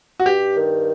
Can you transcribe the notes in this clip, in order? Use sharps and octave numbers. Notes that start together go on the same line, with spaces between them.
F#4
G2 G4
D#3